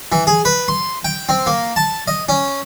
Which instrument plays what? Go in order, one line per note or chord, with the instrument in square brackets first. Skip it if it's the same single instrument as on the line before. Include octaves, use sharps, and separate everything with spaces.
[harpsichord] E3
G#4
B4
C6
G5
C4
A#3
A5
D#5
C#4